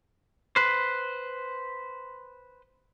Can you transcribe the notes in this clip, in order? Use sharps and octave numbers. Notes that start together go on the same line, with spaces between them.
B4 C5